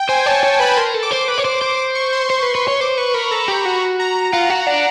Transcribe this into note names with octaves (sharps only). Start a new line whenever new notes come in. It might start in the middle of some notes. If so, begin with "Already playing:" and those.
Already playing: G5
C5 G#5
C#5 A5
C#5
B4 B5
A#4 C6
A4
D6
C5
B4
C#5
C5
C5
D6
C#6
C6
C5 C6
B4
B4 C#6
C#5
C5 D6
B4 C#6
A#4 B5
A4 A#5
G4
F#4
A#5
A#5
F4 F#5
F#4
D4